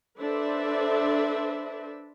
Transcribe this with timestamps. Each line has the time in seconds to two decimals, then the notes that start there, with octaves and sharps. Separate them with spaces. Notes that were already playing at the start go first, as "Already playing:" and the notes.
0.19 D4 A4 B4 C5 D5 E5